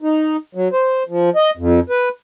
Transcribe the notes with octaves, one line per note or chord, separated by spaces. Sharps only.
D#4
F#3
C5
F3
D#5
F2
B4